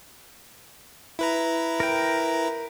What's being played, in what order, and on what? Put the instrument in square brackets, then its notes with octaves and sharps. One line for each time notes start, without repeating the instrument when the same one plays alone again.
[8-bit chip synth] E4 B4 A#5
[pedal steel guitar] A#4 G5